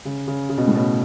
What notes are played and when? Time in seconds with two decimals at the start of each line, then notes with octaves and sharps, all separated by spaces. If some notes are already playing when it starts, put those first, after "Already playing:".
0.05 C#3
0.27 C#3
0.49 C#3
0.57 B2
0.67 A2
0.75 B2